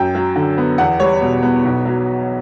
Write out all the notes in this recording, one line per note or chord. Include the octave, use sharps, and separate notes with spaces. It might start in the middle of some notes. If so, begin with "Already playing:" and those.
Already playing: F#2 G5
F#3
D3
B3
E2 F#5
G3 C#5
B2
B3
B1
F#3